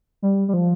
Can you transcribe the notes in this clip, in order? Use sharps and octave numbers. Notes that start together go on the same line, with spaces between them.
G3
G3
F3